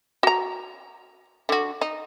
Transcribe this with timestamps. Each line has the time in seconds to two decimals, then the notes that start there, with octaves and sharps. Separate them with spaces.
0.23 F#4 A#5
1.49 D3 F#4
1.81 D#4